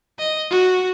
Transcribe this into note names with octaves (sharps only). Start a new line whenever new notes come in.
D#5
F#4